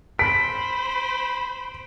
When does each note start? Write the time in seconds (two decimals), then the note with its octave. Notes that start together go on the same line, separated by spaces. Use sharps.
0.19 C5 B5 B6 D7